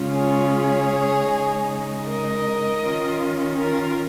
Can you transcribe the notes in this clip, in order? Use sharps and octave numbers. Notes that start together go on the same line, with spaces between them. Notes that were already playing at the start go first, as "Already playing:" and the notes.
Already playing: C#3 G#3 C#4 F4
G#4 C#5
C#3 G#3 D#4
A#4 D#5
D#3 C#4 F4
F4 A#4